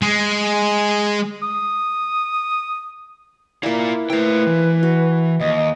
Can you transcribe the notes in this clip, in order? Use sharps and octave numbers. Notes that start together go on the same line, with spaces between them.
G#3
D#6
A#3 E4 F4 D5
A3 E4 B4 C5 G5
E3
F#4
D#2 D#5